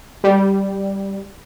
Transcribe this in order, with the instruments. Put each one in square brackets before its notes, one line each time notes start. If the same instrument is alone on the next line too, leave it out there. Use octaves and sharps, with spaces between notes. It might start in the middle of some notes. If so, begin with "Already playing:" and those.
[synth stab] G3